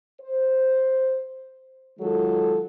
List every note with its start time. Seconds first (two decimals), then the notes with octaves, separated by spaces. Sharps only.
0.21 C5
2.00 D#3 F#3 G#3 F4 A4